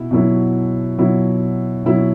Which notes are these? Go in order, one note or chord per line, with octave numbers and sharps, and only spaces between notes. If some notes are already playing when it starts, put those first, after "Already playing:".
Already playing: B2 E4
B2 F#3 E4
B2 F#3 E4
B2 F#3 E4